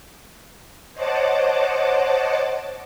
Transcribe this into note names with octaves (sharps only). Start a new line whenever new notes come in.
C5 C#5 D#5 F#5 A5 D6